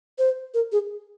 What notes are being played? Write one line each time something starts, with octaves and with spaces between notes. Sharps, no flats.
C5
A#4
G#4